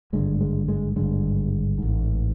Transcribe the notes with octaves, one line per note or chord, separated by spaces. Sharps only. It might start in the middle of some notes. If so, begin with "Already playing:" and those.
G#1 G2 D3 G#3
G#3
G#3
G#1 G2 D3 G#3
A1 G#2